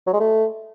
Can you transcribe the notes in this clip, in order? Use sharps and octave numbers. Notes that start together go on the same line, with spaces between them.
F#3
G#3
A3